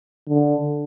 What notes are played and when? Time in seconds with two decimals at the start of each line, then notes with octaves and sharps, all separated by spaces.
0.29 D3